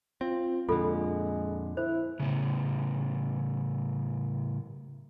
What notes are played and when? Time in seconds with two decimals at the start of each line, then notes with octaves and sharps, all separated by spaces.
0.21 C4 F4
0.69 F2 A#2 D3 G#3 F4 A4
1.77 E4 C5
2.20 A2 C#3